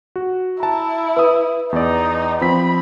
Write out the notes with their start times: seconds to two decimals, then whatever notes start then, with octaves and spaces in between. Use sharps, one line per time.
0.16 F#4
0.60 E4 A5 A#5
1.17 B4 D#6 E6
1.72 E2 D#4 D5
2.41 F3 C4 B5 B6